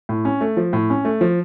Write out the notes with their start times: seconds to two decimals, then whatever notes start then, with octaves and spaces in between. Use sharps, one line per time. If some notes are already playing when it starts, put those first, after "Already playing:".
0.09 A2
0.25 C#4
0.41 A3
0.57 F3
0.73 A2
0.90 C#4
1.05 A3
1.21 F3